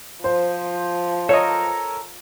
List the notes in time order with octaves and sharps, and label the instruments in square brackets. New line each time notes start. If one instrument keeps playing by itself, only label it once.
[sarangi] F3 [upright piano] C5
[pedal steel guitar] A4 A#4 [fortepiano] C#5 D#5